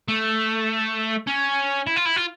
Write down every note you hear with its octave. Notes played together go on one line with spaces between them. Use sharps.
A3
C#4
E4
F4
E4
F4